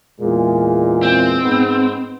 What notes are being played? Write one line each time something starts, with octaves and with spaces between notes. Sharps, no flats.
E2 A#2 G#3
C4
G#2 B3